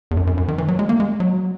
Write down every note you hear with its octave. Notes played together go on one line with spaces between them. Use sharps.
E2
F#2
F#2
F#2
D#3
E3
F#3
G#3
A#3
G#3
F#3